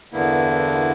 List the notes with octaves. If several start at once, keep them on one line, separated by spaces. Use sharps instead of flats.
E2 G2 D3 A#3 B3 E4